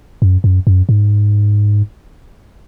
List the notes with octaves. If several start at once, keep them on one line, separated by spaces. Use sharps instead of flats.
F#2
F#2
F#2
G#2